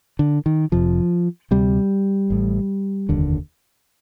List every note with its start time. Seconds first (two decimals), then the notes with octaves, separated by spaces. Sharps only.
0.19 D3
0.46 D#3
0.72 F1 F2 C3 F3
1.51 D2 C3 G3
2.30 A1 A2
3.09 F1 D#2 D3